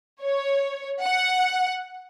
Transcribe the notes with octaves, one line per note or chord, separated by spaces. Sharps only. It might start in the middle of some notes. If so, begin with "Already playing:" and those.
C#5
F#5